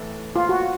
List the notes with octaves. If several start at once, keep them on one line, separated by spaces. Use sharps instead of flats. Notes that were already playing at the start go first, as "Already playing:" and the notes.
Already playing: A2 E3
F4
F#4